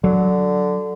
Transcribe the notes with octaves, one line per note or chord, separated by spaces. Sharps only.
D3 F#3